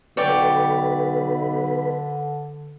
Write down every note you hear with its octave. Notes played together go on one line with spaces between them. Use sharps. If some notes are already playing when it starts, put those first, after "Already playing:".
B1 D3 B4 C#5 D5 G5